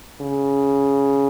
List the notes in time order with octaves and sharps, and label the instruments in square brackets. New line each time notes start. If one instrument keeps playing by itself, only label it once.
[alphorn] C#3